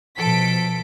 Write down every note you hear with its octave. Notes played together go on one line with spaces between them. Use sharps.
B2 F3 A4 B6 D7